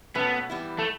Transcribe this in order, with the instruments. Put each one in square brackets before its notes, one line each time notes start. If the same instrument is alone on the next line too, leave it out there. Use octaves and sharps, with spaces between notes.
[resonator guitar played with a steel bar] B2 A3 C#4 [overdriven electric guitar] B3
[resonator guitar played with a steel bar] E3 G3 B3 E4
[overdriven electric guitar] A3